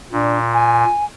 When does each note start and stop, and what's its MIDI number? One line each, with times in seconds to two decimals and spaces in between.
0.12 0.84 46
0.12 0.38 62
0.53 1.05 80